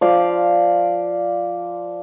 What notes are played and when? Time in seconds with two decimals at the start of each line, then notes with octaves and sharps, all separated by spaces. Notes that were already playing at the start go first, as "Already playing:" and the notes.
0.01 F3 D5 F5